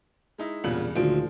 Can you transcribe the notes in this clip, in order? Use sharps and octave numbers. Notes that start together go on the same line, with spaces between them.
G#3 D#4 E4
E1 E2 G2 A#2 C#3 F#7
D2 A#2 D#3 F3 G#3 F4 D7